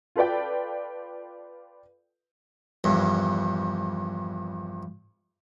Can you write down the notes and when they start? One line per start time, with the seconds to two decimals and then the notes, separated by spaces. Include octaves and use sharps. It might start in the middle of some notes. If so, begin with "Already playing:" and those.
0.16 F4 A4 B4 D5 G5
2.84 A#1 E2 G2